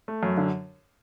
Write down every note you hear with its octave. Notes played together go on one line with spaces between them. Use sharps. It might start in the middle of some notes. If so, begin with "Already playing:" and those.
A3
F#2
D3